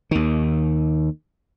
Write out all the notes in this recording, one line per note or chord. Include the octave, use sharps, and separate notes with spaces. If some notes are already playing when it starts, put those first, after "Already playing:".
D#2 D#3